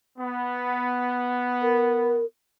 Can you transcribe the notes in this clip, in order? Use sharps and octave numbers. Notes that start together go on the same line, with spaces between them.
B3
A#4